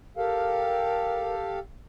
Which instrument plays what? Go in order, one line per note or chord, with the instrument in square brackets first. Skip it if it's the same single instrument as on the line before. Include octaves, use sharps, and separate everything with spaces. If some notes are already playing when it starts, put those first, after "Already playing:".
[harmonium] G4 A4 F5 [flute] A#4